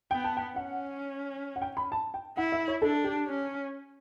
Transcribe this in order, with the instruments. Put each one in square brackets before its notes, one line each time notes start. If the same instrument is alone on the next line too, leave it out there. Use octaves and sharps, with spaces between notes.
[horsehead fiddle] B3 [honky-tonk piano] G5
[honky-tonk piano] A5
G5
[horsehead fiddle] C#4 [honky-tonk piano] F#5
[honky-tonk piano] F#5
G5
B5
A5
G5
[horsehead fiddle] E4 [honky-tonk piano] F#5
[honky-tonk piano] E5
C#5
[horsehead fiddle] D4 [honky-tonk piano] A4
[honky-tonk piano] G4
[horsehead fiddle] C#4